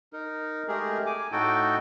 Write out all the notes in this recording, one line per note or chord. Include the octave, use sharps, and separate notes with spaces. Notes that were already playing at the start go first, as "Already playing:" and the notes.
D#4 A#4
G#3 A3 G4 G#4 A#4
G#5 D6
A2 D#4 F#4 A4 G5